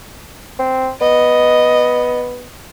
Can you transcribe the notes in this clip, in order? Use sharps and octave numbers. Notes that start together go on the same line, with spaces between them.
C4
B3 D#5